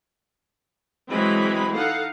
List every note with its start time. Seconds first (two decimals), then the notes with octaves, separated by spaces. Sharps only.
1.10 E3 F#3 G#3 C4 B5
1.75 D#4 A4 F5 F#5